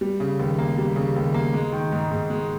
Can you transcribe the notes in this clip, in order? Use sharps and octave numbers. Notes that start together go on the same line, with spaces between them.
G3
C#3
D#2
A#3
G3
C#3
D#2
A#3
G#3
D#3
G#2
G#2
G#3